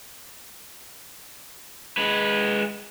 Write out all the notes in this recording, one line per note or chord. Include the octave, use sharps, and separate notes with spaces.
G#3 B4